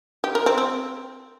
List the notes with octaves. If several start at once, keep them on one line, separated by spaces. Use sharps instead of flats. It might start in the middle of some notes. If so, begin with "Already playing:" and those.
G4
A#4
C4
C4